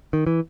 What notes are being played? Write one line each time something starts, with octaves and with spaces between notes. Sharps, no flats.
D#3
E3